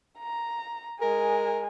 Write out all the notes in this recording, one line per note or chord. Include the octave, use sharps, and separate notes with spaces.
A#5
G#3 A#4 G#5